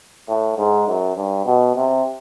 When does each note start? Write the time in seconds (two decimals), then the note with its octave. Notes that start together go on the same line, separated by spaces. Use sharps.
0.29 A2
0.58 G#2
0.87 F#2
1.16 G2
1.46 B2
1.75 C3